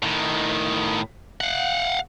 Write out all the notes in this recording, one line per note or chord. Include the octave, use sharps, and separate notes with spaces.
A2 D#3
F5 F#5